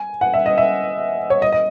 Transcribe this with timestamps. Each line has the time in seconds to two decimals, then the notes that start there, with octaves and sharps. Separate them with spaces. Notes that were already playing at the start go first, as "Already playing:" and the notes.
Already playing: G#5
0.21 F#5
0.34 E5
0.46 D#5
0.58 E5
1.30 C#5
1.42 D#5
1.52 D#5